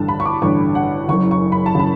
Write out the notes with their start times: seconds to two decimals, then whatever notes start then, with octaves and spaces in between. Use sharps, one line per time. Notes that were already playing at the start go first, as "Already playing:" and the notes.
Already playing: A1 G2 D3 A5
0.08 B5
0.20 C#6
0.25 D6
0.42 A1 G2 D3 C#6
0.75 F#5
1.08 F#1 F#2 C#3 C#6
1.31 C#6
1.52 B5
1.66 A5
1.75 C#3 B5